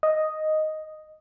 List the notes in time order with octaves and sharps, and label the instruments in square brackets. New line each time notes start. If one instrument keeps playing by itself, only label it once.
[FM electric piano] D#5